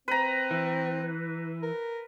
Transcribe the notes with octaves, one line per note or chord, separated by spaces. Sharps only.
C4 B4 A#5
E3
A#4